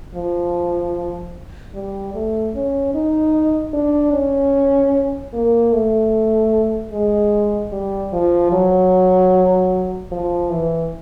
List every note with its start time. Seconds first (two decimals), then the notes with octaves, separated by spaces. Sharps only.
0.15 F3
1.75 G3
2.14 A3
2.55 C#4
2.95 D#4
3.73 D4
4.13 C#4
5.34 A#3
5.73 A3
6.92 G#3
7.72 G3
8.12 F3
8.52 F#3
10.12 F3
10.51 E3